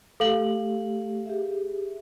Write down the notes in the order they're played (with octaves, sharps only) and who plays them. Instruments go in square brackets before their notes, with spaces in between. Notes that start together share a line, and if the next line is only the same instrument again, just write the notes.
[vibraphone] A3 G4 [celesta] A4 F5 F#7
[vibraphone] G4 G#4 E5